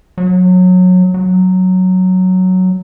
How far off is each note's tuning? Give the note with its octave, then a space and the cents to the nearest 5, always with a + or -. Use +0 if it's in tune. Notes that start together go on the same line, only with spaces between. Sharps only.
F#3 -20
F#3 +0